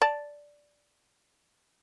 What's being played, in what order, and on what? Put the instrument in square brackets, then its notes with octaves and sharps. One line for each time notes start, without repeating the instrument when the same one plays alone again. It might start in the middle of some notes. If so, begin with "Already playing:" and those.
[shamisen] D5 A5